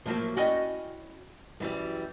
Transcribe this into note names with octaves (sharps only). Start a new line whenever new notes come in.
A2 F3 F#3 A#3
C#4 E4 F#4 D5 D#5 G5
F#2 E3 G3